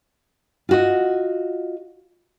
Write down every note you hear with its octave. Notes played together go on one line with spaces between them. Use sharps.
F4 F#4 D#5